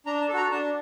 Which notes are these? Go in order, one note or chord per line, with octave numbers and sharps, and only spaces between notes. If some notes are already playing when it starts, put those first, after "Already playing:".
D4 A#5
A5
A4
F#4 A#5
D4 A5